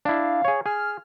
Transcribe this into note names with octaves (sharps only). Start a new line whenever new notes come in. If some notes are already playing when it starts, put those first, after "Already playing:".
D4 E4 F5
G#4 C#5
G#4 F6